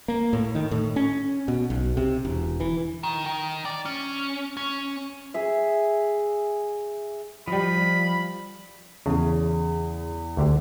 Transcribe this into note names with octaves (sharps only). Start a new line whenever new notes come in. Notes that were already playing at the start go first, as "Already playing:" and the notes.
A#3
A2
D#3
A2
C#4
B2
B1
C3
E1
E3
D#3
D#3
D5
C#4
C#4
G#4 E5
F3 G3 D#5 B5
E2 C#3 G#4
D2 D3 G4